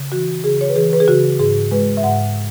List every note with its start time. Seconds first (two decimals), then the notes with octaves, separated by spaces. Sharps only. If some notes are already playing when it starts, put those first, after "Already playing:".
Already playing: C#3
0.12 E3 F#4
0.44 C#3 G#4
0.61 C#5
0.69 B4
0.76 E3 G#4
0.93 B4
1.00 G#4
1.08 C#3 F#4
1.39 G#2 G#4
1.71 G#3 B4
1.97 E5
2.03 G#2 F#5